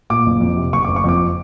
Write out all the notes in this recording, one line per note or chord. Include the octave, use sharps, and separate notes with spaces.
A#2 D6
F#1
F2
C3
F#1 C#6
D6
F#1
C#6
F2 D6